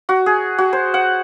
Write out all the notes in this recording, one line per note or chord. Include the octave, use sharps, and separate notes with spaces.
F#4
G#4
F#4
C5
F#5